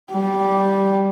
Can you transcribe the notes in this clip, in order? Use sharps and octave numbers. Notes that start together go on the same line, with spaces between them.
G3